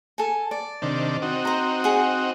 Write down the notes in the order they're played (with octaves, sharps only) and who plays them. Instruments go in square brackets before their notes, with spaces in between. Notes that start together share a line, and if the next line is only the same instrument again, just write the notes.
[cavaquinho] A4 G#5
D5
[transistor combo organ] C3 D#3 D4
C4 D#4 F#4
[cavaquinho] C5 A#5
G#4 F#5